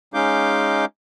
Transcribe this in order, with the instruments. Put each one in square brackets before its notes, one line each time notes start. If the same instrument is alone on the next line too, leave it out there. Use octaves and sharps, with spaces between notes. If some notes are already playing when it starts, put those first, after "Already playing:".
[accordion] G#3 C#4 D#4 F5 D6 G6